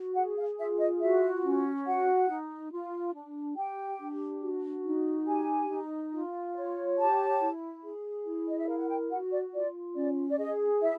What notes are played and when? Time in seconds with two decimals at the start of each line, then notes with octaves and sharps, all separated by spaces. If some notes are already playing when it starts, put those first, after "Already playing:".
Already playing: F#4
0.15 G#4 F#5
0.37 F5
0.58 F4 E5
0.79 D#5
1.01 F#4 E5
1.44 C#4
1.85 F#4 F#5
2.28 D#4
2.71 F4
3.13 D4
3.56 G4 G5
3.99 D4
4.41 F#4
4.84 D#4
5.26 G4 G#5
5.69 D#4
6.13 F4
6.54 C#5
6.97 G4 A5
7.40 E4
7.83 G#4
8.25 E4
8.48 D#5
8.57 E5
8.67 A#4 F5
8.78 F#5
8.89 G5
9.10 F#4 F#5
9.31 D5
9.53 F4 D5
9.95 C#4 D5
10.29 D5
10.37 G#4 D#5
10.81 E4 E5